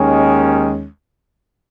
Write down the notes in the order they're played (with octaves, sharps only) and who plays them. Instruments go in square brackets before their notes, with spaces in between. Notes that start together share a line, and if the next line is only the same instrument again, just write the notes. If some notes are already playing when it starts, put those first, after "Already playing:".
Already playing: [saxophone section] D#2 D#3 G#3 C#4